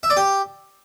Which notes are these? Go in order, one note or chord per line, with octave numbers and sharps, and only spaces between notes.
E5
D5
G4